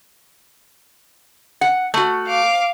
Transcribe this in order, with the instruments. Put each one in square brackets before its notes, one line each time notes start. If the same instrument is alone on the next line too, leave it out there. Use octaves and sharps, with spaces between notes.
[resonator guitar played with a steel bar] F#5
A3 F#4
[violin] F5 D6